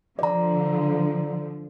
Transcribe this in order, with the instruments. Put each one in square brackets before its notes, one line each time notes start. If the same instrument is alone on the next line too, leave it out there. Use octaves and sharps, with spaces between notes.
[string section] D3 F3 [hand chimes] D5 A#5